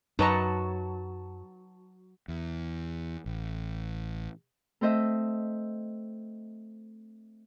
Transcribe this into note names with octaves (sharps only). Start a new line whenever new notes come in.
F#2 F#3 D#4 B4 A5 A#5 C#6
E2
A1
A3 C4 C5 D#5 E5